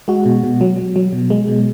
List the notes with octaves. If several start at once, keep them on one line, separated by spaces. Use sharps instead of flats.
G#3 F#4
B2
B2
F#3
F#3
F#3
B2
G#3
B2